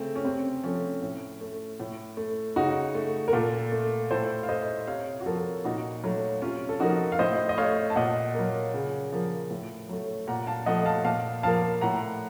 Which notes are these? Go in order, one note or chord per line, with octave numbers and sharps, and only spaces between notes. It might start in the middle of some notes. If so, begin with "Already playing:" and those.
Already playing: C#3 A3 C4
C#4
C3 C4
F3 A3 C#4
A2
A3
A2
A3
C#3 D#4 F#4
A3
A#4
A#2 F4 A4
A3
A2 A4 C5
F5
A3 C5 D#5
C3 C#5 F5
F#4
F3 A#3 F4 A4
A#2 D#4 F#4
F#3 A3
C3 C#4 F4
A4
F3 A#3 D#4 F#4
F5
A2 C5 D#5
D#5
A3 C#5 F5
A5
A#2 D#5 F#5
F#3 A#3
C#3
F3 A#3
A2
F#3 A3
A#2 F#5 A#5
F5 A5
F3 A3 D#5 F#5
F5 A5
A#2 F5 A5
F3 A#3 F5 A5
A2 F#5 A#5